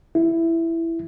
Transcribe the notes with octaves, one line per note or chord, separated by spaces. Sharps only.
E4